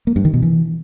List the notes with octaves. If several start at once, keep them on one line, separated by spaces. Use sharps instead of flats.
A#3
G2
D#3
B2
E3